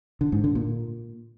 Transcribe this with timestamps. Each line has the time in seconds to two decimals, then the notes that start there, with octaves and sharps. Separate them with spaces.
0.21 D3
0.32 G#2
0.44 D3
0.55 A#2